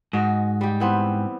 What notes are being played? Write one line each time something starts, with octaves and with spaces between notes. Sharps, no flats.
G#2 F#4 D#5
G3 G4
E3 B3 C4